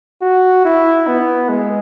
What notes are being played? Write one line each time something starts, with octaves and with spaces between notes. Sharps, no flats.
F#4
E4
B3
G#3